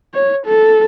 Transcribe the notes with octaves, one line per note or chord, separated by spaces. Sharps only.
C#5
A4